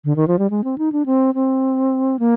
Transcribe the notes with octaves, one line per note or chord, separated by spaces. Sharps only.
D3
D#3
F3
G3
G#3
C4
D#4
D4
C4
C4
A#3